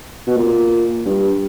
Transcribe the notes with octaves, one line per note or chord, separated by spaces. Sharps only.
B2
A#2
G2